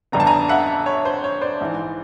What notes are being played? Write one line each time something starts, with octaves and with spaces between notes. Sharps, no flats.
G1 F2 D3 G3 B3 A#5
A5
G#5 A#5
E5 F#5
C#5
C5
C#5
C5 D5
A#1 G#2 E3